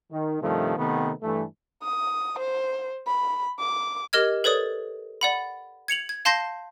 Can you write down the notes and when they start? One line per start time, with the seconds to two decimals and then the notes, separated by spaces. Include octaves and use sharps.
0.12 D#3
0.42 G2 C3 D#3 F3 A3
0.78 C3 D#3 A3 B3
1.23 G2 E3 A3
1.83 D#6
2.39 C5
3.07 B5
3.60 D6
4.13 G4 A#4 D#5 F6 G#6
4.44 A4 B4 C#5 D5 D#6
5.21 D5 F#5 B5
5.88 G#6 C#7 F7 F#7
6.09 G#6
6.25 F5 A5 C6 G6 A#6 C7